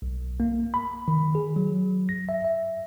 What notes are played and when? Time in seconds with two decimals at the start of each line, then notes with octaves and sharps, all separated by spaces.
0.02 B1
0.40 A#3
0.74 B5
1.08 D#3
1.35 G#4
1.56 F#3
2.09 A#6
2.29 E5
2.45 E5